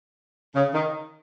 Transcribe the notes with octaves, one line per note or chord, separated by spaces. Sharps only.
C#3
D#3